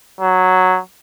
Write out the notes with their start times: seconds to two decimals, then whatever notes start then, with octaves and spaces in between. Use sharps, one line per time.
0.21 F#3